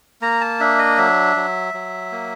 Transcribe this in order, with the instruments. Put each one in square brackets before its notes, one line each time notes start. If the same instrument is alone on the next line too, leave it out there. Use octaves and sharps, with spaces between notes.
[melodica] A#3 A#5
A5
D4 E5
D#5
F#3 E5
F#3
F#3
A#3